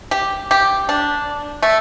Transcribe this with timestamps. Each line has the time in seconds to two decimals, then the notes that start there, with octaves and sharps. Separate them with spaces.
0.11 G4
0.51 G4
0.89 D4
1.62 A3